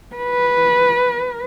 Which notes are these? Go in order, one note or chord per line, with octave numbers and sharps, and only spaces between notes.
B4